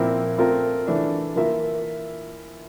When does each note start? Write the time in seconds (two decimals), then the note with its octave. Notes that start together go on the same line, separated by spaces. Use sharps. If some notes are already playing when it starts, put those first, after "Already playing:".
Already playing: A#2 F3 C4 E4 A#4
0.38 A3 C4 F4 A#4
0.87 E3 A3 D4
1.36 E3 A#3 F4 A#4 E5